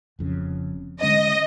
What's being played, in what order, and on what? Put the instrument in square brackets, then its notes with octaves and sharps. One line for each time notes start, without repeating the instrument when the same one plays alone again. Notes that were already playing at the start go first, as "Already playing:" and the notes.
[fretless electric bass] F1 F2 C#3
[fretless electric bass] D3 G#3 C#4 [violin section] D#5